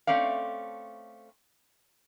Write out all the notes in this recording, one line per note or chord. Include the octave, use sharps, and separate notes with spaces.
A3 C4 C#4 D5 F5